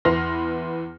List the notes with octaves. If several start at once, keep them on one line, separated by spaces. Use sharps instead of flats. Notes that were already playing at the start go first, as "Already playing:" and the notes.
E2 E4 B4 C6 F6 A#6